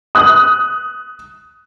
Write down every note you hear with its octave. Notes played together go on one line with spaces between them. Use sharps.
D#6 F#6